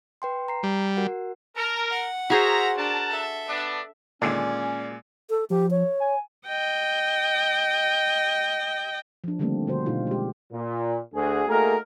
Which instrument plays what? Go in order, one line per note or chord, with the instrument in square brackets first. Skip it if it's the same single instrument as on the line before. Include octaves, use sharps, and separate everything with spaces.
[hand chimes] B4 G5 C6
A#5 C7
[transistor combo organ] G3
[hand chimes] F#4 A#4 F#5
[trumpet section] A#4 [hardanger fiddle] A5 A#5
[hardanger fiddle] F#5
[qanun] F#4 G#4 C5 [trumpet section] A#4 E5 A#5
[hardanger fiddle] D4 [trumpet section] A#4 F#5 A5
[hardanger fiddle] A4 E5
[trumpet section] B3 D4
[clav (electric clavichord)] D#2 D3 D4 [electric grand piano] A#2 G#3 G#5 [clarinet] C#4 [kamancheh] D5
[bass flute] A4
[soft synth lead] F3 [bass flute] G4
[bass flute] C#5
[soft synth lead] G#5
[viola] D#5 G5
[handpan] F3 D4
D3 D#3 G3 A3 A#3 C4
B2 D3 F#4 C5
B2 D#4 F4 G4
G#3 G4
[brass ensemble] A#2
D2 F#4 G#4
A3 A#3 D#4 F#4 G#4 A#4